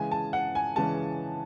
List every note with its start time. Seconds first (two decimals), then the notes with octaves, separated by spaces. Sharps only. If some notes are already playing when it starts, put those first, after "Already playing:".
Already playing: C#3 E3 G#3 C#4 G#5
0.11 A5
0.33 F#5
0.55 G#5
0.76 C#3 E3 G#3 C#4 A5